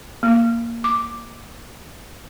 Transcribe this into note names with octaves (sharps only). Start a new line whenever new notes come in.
A#3
D6